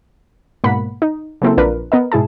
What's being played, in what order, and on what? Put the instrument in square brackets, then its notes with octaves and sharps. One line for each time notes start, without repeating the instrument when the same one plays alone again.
[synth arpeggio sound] G#2 B2 A#3 F#5 B5 B6
D#4
C#3 F#3 A#3 C4 E4 A4
A#1 D4 F4 A#4 B4
B3 A#4 D#5
G#2 B2 E4 G#4 A5